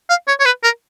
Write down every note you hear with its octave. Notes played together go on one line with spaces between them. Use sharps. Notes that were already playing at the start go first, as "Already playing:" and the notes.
F5
C#5
C#5
B4
A#4